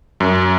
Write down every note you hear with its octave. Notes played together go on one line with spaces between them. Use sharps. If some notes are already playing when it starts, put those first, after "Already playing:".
F#2